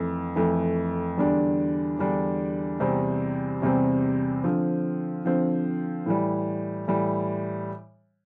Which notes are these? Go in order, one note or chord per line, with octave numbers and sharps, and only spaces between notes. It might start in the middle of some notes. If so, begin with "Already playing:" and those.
Already playing: F2 E3 A3
F2 E3 A3
E2 D3 G3 D4
E2 D3 G3 D4
E2 C3 G3 C4
E2 C3 G3 C4
D3 F3 C4
D3 F3 C4
A2 E3 G3
A2 E3 G3